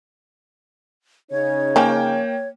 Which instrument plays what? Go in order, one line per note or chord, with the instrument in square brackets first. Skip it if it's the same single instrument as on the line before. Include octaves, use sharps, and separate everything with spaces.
[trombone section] C#3 D#4 [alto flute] C#5
[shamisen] F3 C#4 [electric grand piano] A#3 G5